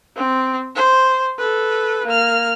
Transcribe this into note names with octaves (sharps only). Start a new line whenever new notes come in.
C4
C5
A4 B4
A#3 F6